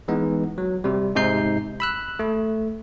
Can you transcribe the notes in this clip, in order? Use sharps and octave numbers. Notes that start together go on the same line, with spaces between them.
E3 G#3 B3 D#4
F#3
C3 G3
G#2 C3 D#4 G6 C7
B5 E6 F#6
A3